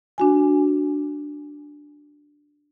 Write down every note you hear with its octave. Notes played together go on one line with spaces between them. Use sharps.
D4 F#4 G#5